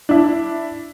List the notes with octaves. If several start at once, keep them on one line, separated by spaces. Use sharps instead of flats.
D4 E4